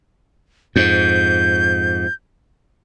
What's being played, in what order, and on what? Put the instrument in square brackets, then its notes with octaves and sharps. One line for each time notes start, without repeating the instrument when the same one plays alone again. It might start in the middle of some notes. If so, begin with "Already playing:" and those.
[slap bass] F2 G#2 [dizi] G6